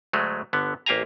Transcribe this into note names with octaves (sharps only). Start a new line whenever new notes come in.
D2 F#3 G#3 A3
G1 D3 B3
A1 A#3 G4 F5 G#5 A#5